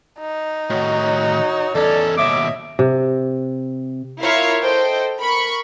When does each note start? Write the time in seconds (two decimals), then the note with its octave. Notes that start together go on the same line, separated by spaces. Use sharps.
0.19 D#4
0.70 A2 D#3 F#4 C#5
1.75 E2 C#4 A4 D5
2.17 D#2 B2 C#5 D#5 E5 D6
2.79 C3
4.21 E4 F4 A#4 C#5 E5 F5
4.62 A4 C5 D#5 G5
5.19 A#4 B5 C#6